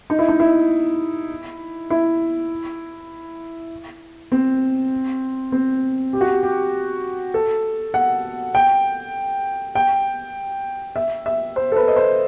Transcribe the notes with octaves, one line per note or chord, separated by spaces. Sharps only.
D#4
E4
D#4
E4
E4
C4
C4
G4
F#4
G4
G4
A4
F#5
G5
G5
E5
E5
C5
A4
B4
D#5
C5